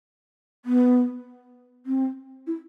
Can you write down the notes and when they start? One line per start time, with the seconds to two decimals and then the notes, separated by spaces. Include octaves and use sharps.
0.65 B3
1.86 C4
2.47 E4